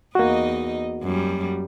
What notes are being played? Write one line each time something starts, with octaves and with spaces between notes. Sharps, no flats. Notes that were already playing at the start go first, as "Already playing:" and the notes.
E2 A#3 D#4 F#4 D#5
F#2 G3